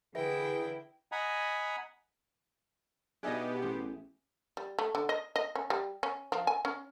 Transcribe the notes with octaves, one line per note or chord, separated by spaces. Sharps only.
D3 E3 E4 G#4 B4 E5 G5 A#6
D#5 F#5 G#5 A#5 B5
B2 B3 D4 D#4 G4 G#4 D#5 E5
A1 C5
G3
A3
D3
D#5
D#5
C#4
G3
C#4
F3
G#5
C#4